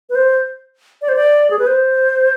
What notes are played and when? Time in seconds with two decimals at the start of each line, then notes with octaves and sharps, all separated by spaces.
0.10 B4
0.15 C5
1.02 D5
1.09 C5
1.16 D5
1.50 G#4
1.59 B4
1.67 C5